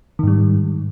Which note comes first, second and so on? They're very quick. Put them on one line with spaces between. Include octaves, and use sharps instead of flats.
D#3 G#2 G3